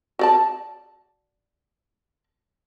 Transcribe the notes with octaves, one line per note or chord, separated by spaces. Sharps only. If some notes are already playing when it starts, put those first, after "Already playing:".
F#4 D5 A5